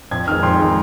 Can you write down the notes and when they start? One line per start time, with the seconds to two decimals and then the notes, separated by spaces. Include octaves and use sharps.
0.11 F2 G#6
0.28 D#3 G#3 F6
0.43 F2 C6
0.59 D#3 G#3